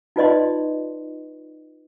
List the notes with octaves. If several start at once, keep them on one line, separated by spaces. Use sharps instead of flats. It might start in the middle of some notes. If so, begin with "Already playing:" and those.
D#4 F4 B4 D5 D#5 C6